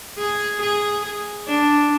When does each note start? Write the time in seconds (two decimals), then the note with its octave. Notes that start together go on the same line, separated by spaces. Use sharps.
0.18 G#4
0.61 G#4
1.48 D4